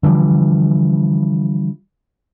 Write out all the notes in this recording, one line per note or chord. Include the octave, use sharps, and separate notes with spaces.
D3 E3 F3 G3